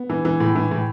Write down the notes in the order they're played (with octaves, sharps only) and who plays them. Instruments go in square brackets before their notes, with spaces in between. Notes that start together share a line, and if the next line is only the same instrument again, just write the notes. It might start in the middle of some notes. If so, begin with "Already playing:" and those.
Already playing: [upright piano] B3
E3
E3
A2
E3
A2